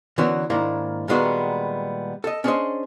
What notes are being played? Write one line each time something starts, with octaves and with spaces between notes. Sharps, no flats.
D3 E3 B3 C#4 F#4 A#4
G#2 D#3 A#3 D4 E4
A#2 D#3 G3 G#3 B3 F#4
A4 D#5
C#4 D4 G#4 A#4 C5 D#5